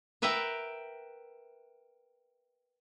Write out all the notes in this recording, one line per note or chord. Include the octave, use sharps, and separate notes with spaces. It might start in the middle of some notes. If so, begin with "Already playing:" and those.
A#4 B4 E5 F#5 G5 A#5